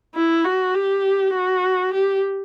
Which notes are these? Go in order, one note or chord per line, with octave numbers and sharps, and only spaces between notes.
E4
F#4
G4
F#4
G4